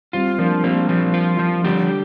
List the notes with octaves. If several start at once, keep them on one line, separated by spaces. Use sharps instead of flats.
G3 C4 F4
F3 A#3 D4
G3 A#3 C4
F3
F4
F3
D3 G3 G4